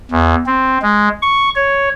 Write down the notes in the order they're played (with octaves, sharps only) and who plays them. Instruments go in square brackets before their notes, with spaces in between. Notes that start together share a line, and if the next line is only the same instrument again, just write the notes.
[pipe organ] E2
C4
G#3
C#6
C#5